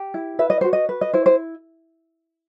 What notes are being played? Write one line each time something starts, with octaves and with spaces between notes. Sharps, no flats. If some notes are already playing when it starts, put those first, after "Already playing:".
Already playing: G4
E4
B4 E5
D#5
F#4 C5
D#5
B4
D#5
E4 C5
C5